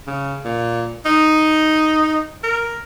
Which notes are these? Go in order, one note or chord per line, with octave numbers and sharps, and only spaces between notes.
C#3
A#2
D#4
A#4